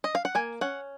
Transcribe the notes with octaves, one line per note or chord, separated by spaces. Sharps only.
D#5
F5
F#5
A#3 G#5
C#4 F#5